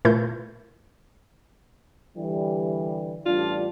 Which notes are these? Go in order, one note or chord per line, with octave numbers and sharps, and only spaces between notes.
A#2 A3 E4 A#4 G6
D3 E3 G3
A1 G3 D4 F4